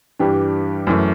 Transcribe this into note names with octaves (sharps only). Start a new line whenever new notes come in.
G2 E3 G3 D4 G4
F#2 E3 A3